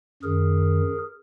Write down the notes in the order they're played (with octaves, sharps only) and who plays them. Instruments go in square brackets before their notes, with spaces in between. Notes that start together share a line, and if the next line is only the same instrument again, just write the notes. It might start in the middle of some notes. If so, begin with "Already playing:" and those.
[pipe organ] F#2 D#3 G#4 A#4